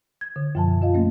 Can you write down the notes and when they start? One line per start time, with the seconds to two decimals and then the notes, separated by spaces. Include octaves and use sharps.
0.21 G#6
0.36 D3
0.55 F#2 B2 F3 G#5 A5
0.82 F4 D#5 F5
0.94 A3 A#3 C#4